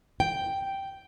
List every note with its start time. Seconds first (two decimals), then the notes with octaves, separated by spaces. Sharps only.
0.20 G5